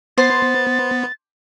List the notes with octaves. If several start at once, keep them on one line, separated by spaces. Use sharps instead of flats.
B3 C5 A6